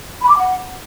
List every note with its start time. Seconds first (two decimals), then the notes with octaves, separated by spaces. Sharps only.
0.23 B5
0.30 D6
0.36 F#5